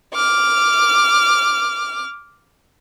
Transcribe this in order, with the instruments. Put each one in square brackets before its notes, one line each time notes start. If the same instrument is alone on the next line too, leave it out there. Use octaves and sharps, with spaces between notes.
[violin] D6 F6